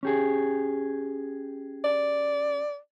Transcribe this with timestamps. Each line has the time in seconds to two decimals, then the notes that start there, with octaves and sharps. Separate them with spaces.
0.03 C#4 G4 G#4
1.84 D5